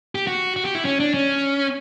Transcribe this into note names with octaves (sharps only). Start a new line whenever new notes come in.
G4
F#4
F#4
G4
E4
C#4
D4
C#4